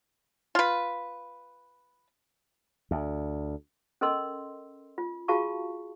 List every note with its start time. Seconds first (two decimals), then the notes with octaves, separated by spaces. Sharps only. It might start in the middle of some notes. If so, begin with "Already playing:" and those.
0.55 F4 B4
2.91 D2
4.01 C#4 A4 A#4 D#5 C6 E6
4.98 F4
5.28 F4 F#4 G#4 F5 A5 C#6